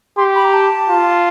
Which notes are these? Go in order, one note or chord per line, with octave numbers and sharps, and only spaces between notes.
G4 C6
B5
A#5
A5
F4